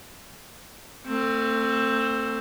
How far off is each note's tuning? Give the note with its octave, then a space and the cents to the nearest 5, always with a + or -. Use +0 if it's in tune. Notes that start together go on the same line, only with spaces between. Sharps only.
A3 +35 C4 +10